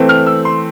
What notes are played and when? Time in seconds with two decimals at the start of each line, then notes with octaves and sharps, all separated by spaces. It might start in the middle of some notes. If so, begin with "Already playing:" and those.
Already playing: E3 A3 C4
0.09 F6
0.27 E6
0.45 C6